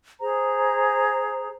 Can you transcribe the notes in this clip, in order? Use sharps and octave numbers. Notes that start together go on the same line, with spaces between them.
G#4 C5 A#5